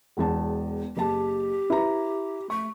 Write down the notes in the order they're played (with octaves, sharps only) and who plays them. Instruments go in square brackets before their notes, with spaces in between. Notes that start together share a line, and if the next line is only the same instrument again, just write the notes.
[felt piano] E1 E2 A5
[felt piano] F#1 A5 [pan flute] G4
[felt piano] E4 B4 A#5
[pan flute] A3 [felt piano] C#6